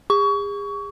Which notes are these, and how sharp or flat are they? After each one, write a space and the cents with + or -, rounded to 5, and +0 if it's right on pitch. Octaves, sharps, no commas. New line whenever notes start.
G#4 -40 C#6 +25